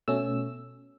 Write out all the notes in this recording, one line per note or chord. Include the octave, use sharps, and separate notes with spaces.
B2 A3 C#4 E6